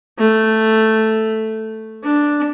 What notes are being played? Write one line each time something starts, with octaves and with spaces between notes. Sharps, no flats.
A3
D4